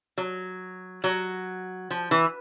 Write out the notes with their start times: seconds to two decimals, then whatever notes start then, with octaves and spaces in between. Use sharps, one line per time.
0.18 F#3
1.04 F#3
1.90 F3
2.11 E3